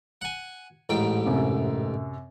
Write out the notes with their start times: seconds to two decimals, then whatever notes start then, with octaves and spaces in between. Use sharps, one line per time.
0.21 F#5 G#5
0.89 A1 G#2 G5
1.26 F#2 C3